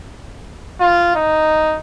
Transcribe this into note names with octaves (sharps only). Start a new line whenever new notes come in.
F4
D#4